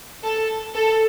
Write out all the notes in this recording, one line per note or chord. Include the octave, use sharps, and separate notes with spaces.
A4
A4